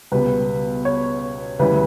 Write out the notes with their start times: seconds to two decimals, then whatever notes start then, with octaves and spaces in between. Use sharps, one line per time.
0.12 C#2 B2 G3 B4
0.85 C#5
1.59 D2 C#3 E3 G3 B4